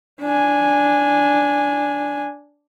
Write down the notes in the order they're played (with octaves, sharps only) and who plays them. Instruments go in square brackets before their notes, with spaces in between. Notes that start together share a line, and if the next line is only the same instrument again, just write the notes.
[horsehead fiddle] D4 G#5